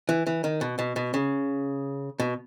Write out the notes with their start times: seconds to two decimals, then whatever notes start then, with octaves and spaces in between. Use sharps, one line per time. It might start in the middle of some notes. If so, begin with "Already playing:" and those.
0.09 E3
0.27 E3
0.44 D#3
0.61 B2
0.79 B2
0.96 B2
1.14 C#3
2.20 B2